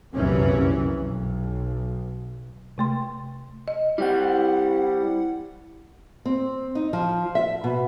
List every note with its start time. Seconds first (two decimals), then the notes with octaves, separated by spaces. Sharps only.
0.15 F1 C2 F#2 A#2 E3 C#4
0.96 B1
2.78 C3 A3 C6
3.68 D#5
3.98 G3 C4 E4 F#5
6.25 C4
6.75 D#4
6.93 F3
7.35 E5
7.64 B2